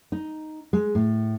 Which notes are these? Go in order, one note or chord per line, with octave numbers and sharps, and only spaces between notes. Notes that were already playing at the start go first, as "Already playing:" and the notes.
D#4
G#3
A2